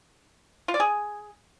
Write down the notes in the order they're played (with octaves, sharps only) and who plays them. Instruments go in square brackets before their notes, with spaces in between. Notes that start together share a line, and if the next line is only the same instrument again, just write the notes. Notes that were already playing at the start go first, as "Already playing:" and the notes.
[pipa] F4
D5
G#4